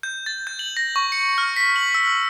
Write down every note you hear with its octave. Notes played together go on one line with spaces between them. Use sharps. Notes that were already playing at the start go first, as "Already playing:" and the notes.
G6
A6
G6
F#7
A#6
C#6
C#7
F6
B6
F#7
E6
E6